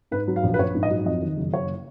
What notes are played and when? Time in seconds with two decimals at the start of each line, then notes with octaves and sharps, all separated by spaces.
0.11 G#2 B4
0.28 F#3
0.36 F5
0.43 A#1
0.54 B4
0.59 A#1 C#5
0.75 G#2
0.83 D#5
0.90 F#3
1.05 F2 D#5
1.22 D#3
1.37 F#1
1.53 F#1 C#5